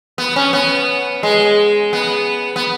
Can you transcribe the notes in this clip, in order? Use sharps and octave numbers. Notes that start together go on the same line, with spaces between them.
B3
C#4
B3
G#3
B3
B3